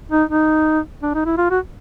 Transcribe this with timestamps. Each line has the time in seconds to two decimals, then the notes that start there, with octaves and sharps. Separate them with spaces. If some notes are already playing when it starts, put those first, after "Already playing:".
0.11 D#4
0.30 D#4
1.02 D4
1.14 D#4
1.25 E4
1.37 F4
1.50 F#4